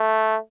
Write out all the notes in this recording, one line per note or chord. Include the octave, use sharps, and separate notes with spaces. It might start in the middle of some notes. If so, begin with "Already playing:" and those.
Already playing: A3